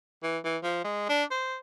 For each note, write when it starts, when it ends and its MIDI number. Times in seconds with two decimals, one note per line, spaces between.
0.23 0.38 52
0.45 0.57 52
0.63 0.80 53
0.84 1.05 56
1.09 1.24 62
1.31 1.56 72